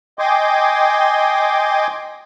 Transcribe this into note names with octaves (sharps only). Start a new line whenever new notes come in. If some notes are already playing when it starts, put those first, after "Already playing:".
D#5 G5 G#5 C6 D6